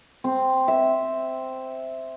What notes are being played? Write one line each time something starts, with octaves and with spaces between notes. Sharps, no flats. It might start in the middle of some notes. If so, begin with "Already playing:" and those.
C4
E5